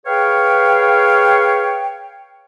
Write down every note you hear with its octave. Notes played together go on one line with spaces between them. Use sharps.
G#4 B4 C#5 F5 G5